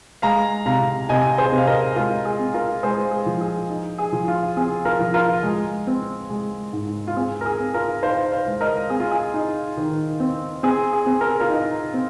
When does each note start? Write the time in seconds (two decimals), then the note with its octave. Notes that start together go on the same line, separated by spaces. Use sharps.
0.22 G#3 F5 A#5
0.66 C3 F5 A#5
1.09 C3 D#5 G#5
1.38 G#4 C5
1.52 C3
1.58 F5
1.67 A#4 D#5
1.96 G#3 F4 A#4
2.25 G#4
2.39 C4
2.54 F4 A#4
2.83 G#3 G#4 C5
3.11 G#4
3.26 F3
3.41 G#4
3.70 D#4
3.98 G#4
4.13 F3
4.28 F4
4.57 C4 G#4
4.85 F4 A#4
5.00 F3
5.14 F4 A#4
5.43 G#3
5.87 C4
6.30 G#3
6.73 G#2
7.07 F4
7.16 C4 G#4
7.41 A#4
7.46 G#4
7.60 C4
7.74 F4 A#4
8.03 D#4 C5 F5
8.32 C5 F5
8.46 G#3
8.61 A#4 D#5
8.90 C4 G#4
9.00 F4
9.11 G#4
9.34 D#4
9.77 D#3
10.20 C4
10.63 C4 G#4
10.93 G#4
11.06 C4
11.21 A#4
11.31 G#4
11.40 F4 A#4
11.50 D#4
11.94 C4